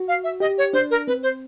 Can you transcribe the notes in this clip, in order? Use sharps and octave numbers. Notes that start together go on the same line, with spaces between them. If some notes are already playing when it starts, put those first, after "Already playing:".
Already playing: F#4
F5
E5
G4 D#5
C#5
D4 C5
A#4
C4 B4
C5